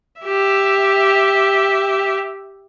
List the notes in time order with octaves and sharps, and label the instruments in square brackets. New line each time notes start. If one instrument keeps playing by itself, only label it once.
[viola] G4 E5